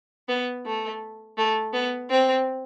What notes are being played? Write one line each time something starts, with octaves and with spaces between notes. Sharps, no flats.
B3
A3
A3
B3
C4